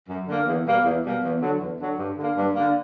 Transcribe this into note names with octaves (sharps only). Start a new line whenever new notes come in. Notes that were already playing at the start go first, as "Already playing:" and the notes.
F#2
D3 A#3
E2
B2 G3 A#3
E2
B2 G3 A#3
E2
D3 F#3
E2
D3 F#3
G2
D3 A#3
G2
D3 A#3